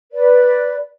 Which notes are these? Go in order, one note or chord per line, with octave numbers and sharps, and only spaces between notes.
B4 D5